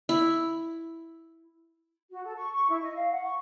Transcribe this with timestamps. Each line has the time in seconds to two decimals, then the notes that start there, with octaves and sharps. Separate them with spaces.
0.09 E4
2.10 F#4
2.24 A4
2.36 C#6
2.53 C#6
2.69 E4
2.82 D#5
2.95 F5
3.11 F#5
3.23 C#6